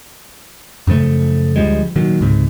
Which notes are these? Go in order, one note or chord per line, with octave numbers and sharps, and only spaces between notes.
F#2 C#3 F3 A3
D2 F3 G3 G#3
A#2 D#3 F#3
C#2 G#2 C3